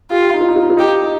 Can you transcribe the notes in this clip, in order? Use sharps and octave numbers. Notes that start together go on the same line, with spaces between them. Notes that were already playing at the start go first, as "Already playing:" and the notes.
F4 G4
G4
D#4
F4
D#4
F4
D#4
F4
D#4 G4
D#4